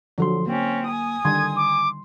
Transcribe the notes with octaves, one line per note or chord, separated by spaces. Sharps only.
D3 F3 F#3 A4 C6
A#3 C4 C#4
G#5 D#6
D3 D#3 G3 C6 G#6
D6